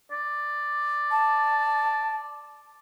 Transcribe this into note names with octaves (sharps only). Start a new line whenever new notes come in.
D5
A5